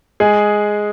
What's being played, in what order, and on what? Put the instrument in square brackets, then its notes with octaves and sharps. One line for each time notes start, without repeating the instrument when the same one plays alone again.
[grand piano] G#3 G#4